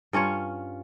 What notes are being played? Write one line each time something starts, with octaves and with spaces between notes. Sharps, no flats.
G2 C#4 F4 C#5